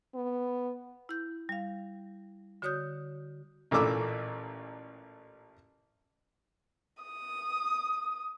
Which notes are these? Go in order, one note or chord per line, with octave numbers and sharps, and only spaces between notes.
B3
E4 G6
G3 F5
D3 F#4 C#5 D#6 F#6 G6
A1 A#2 E3 A3 D6 E6
D#6